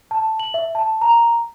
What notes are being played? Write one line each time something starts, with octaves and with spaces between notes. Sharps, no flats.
A5
F#7
E5
A5
A#5